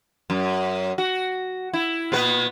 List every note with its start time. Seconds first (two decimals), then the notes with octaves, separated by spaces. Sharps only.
0.30 F#2
0.98 F#4
1.73 E4
2.12 A#2 B3 B4